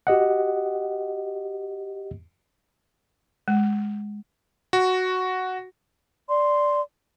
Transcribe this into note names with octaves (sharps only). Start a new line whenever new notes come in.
F#4 G4 D#5 F#5
G#3
F#4
D5 C6